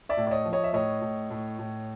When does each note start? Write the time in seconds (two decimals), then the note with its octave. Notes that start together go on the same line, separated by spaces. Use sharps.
0.09 D5 E5
0.17 A2
0.27 D5
0.31 C#5 D#5
0.45 F3
0.53 C#5 D#5
0.64 E5
0.73 A2 C#5 D#5
1.02 A2
1.30 A2
1.59 A2